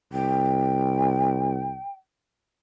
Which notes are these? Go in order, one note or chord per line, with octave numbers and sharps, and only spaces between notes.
C2 G5